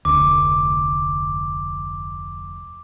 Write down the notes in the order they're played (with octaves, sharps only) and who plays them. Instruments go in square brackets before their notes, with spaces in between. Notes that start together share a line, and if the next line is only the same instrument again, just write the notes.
[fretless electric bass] F1 D2 [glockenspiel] D6